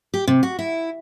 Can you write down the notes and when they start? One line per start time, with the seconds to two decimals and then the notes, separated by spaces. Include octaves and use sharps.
0.14 G4
0.28 C3
0.43 F#4
0.59 E4